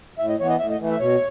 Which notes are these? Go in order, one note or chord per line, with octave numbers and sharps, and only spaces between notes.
A2 E5
D#5
E3 B3 C#5
D#5
A2 E5
D#5
E3 A3
E5
B2 C#5